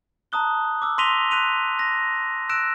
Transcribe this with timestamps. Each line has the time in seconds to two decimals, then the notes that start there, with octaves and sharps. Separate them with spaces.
0.32 A5 A#5 D#6 F#6 G7
0.82 D6 E6
0.98 C6 A#6 B6 D#7 F7 G7
1.31 F#6 B6 D#7 F7
1.79 A#6
2.49 E6 F#6 A#6 D7 E7